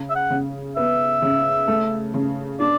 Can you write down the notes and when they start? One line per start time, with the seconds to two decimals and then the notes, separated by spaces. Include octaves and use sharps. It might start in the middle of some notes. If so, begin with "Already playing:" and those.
Already playing: C#3
0.10 E5
0.15 F#5
0.30 C#3
0.76 B3 E5
1.22 C#3
1.68 A3
2.14 C#3
2.60 D4 D5